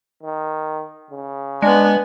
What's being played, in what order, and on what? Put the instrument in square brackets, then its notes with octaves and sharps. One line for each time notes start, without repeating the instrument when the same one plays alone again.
[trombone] D#3
C#3
[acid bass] G#3 [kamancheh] B3 G#5 [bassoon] D4